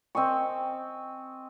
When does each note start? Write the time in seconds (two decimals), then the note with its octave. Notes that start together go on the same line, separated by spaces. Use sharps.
0.15 C4 D#5 G#5 C#6